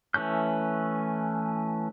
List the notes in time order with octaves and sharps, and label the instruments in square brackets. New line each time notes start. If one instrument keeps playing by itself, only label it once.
[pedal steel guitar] E3 A3 C#4 G6